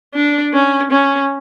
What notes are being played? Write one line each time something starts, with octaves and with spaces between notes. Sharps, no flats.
D4
C#4
C#4